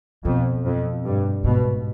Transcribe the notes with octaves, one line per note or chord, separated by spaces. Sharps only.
F2 B2
F2
G2
G#2 B2